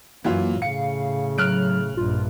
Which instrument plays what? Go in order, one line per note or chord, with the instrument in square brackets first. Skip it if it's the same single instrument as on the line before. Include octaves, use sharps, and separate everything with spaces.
[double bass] F#2 [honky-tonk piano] E3 F#3 F4 [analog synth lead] A#3
[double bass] A2 C#3 [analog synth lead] F5 [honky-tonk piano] C#7
[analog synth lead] F#3 [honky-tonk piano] F6 F#6 D7
[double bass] A#1 G2 [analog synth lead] F4